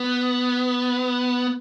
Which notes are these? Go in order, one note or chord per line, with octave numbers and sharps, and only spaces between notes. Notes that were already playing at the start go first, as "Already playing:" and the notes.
Already playing: B3